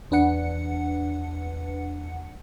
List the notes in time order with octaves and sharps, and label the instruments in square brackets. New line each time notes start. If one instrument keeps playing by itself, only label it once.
[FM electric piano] E2 D4 B4 F#5 C#7